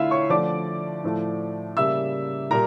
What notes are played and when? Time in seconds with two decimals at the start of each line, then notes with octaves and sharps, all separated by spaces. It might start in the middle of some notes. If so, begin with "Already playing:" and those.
Already playing: D3 A3 E4 F4 E5 F5
0.11 C#5 C#6
0.30 D3 F3 A3 D5 D6
1.04 A2 F3 A3
1.77 C#3 G3 A#3 E5 E6
2.51 A#2 G3 A#4 A#5